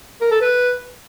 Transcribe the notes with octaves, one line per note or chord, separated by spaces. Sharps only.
A#4
A4
B4